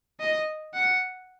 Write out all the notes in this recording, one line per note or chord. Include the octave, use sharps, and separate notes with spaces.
D#5
F#5